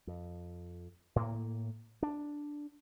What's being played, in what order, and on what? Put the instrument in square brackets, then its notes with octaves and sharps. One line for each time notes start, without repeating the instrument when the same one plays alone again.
[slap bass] F2
A2 A#3
D4